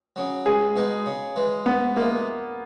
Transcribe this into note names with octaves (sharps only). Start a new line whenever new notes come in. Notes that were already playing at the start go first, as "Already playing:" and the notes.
C#3 F#3
C#2 G#4
B2 G#3 D#4
C#3
E3 G#3
G#2 B3
E3 G#3 A#3